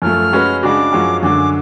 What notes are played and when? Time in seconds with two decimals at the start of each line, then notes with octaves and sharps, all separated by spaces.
0.02 F#2 F3 A3 F6
0.32 G#3 C#4 F#4 B4
0.62 C#3 G#3 D4 F#4 D6
0.93 F#2 F3 G#3 C#4 F#4
1.23 F#2 D3 G#3 D6